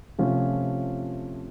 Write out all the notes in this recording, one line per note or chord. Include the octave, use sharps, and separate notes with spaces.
C3 F3 A3 C#4 F4